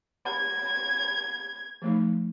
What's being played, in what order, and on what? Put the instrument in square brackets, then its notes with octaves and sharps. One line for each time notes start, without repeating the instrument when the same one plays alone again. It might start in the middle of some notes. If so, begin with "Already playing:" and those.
[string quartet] G#6
[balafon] F3 A3 D#4